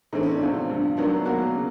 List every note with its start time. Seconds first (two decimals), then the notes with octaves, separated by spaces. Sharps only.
0.13 A2 E3 A3 C4 D#4
0.23 C#4
0.31 D4
0.42 E2 C3 F3
0.69 G2 D3 F3
0.97 C3 D#3 F#3 B3 D4
1.25 B2 F#3 A#3 F#4
1.55 C#3